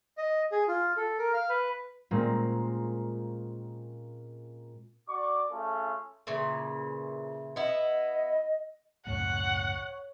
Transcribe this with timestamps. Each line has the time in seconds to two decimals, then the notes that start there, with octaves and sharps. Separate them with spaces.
0.18 D#5
0.52 G#4
0.68 F4
0.97 A4
1.19 A#4
1.33 F5
1.49 B4
2.11 A#2 G#3 A#3 C4 C#4
5.08 F#4 D5 C#6 D6
5.50 A3 C#4 F4 G#4 A4
6.27 A#2 C#3 E3
7.56 B3 E4 D#5
9.07 C#2 F#2 A2 C#5 F#5